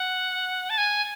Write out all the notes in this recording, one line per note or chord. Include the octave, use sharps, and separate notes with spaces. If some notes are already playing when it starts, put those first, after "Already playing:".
Already playing: F#5
A5
G#5